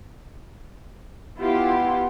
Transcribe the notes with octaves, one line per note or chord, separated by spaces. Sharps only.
B3 E4 F4 G4